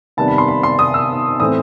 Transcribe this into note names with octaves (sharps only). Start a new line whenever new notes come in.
C3 D#3 G3 B3 A5
B5
C6
B5
C6
D#6
E6
A2 E3 A3 C4 D#6